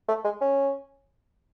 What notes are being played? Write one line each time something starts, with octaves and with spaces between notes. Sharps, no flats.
A3
G#3
C#4